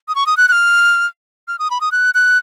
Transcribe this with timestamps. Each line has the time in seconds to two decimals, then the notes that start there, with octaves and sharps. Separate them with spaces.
0.08 D#6
0.15 C#6
0.26 D#6
0.37 F#6
0.48 F#6
0.52 F6
1.48 F6
1.59 D#6
1.71 B5
1.81 D#6
1.92 F#6
2.15 F#6